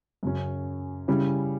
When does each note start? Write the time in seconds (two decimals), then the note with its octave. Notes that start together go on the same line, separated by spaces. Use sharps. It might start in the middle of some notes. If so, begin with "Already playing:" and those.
0.23 F#2 C#3 F#3 C#4
1.08 C#3 G3 C#4 E4